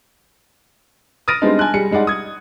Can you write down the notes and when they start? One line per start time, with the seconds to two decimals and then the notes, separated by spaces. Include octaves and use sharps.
1.28 D#6 F6 A6 A#6 D7 D#7
1.42 G3 G#3 B3 C4 D4 D#4
1.59 G#5 A5 F#6
1.74 G3 G#4 C#7
1.91 G3 G#3 D#4 D5 F#5
2.07 D#6 G#6